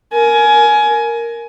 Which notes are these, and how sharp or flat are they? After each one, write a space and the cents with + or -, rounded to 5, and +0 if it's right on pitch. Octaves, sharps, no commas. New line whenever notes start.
A#4 +0 G#5 +20